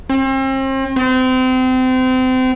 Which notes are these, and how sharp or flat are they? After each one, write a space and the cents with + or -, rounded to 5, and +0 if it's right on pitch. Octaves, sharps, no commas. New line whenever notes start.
C4 +40
C4 -30